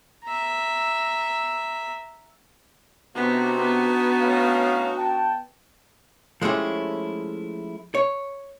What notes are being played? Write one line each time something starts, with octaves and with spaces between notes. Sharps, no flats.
E5 A#5
C3 B3 D4 D#4 F#4
B3
A2 C#4 F5
G5 A5
F3 G#3 A3 C#4 E4 G4
C#5